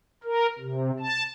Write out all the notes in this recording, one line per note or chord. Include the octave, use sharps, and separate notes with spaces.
A#4
C3
A5